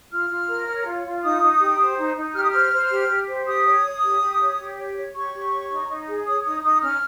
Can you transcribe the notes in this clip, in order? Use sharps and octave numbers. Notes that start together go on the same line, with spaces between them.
F4 F6
F4
A#4
C#5
F4
F4
D#4 D#6
D#4
G4
C5
D#4
D#4
G4 F6
D#6
C5 F6
C5
G4
G4
C5
G4 D#6
C#5
C#5
G4
G4
C#5
G4
C#5
C#5
G4 C#6
G4
C#5
D#4
D#4
G#4
C#5 D#6
D#4 D#6
D#4 D#6
C#4 F6